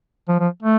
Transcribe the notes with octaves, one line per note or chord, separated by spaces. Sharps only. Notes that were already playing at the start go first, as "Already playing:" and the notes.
F3
F3
A3